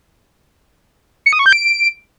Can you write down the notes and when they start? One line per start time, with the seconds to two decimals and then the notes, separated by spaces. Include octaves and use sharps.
1.26 C#7
1.33 D#6
1.39 C#6
1.46 G6
1.53 D7